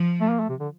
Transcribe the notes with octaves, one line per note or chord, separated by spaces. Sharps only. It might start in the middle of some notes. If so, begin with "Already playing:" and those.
Already playing: F3
A3
A#3
A3
C3
D3